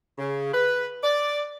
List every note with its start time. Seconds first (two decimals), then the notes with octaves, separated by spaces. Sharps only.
0.19 C#3
0.54 B4
1.04 D5